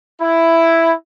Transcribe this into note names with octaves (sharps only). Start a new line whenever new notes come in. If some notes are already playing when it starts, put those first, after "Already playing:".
E4